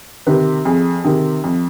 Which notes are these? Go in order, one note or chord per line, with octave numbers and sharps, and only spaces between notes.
C3 D#3 B4
F2 G#4
C3 D#3
F2